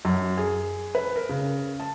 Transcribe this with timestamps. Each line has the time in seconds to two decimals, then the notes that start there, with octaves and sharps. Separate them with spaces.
0.05 F#2
0.37 G#4
0.95 B4
1.16 A#4
1.29 C#3
1.80 A5